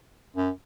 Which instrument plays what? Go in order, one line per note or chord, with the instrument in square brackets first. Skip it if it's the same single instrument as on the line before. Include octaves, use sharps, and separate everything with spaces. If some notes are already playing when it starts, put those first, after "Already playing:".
[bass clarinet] F#2